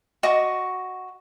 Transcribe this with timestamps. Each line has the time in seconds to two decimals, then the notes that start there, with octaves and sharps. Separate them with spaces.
0.23 F#4 D#5 C#6 D6